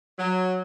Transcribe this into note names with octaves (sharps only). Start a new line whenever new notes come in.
F#3